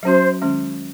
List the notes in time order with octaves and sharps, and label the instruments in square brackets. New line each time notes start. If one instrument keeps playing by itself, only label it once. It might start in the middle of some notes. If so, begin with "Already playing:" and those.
[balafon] F#3 C#4 F#4 [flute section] C5
[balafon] D#3 G#3 C#4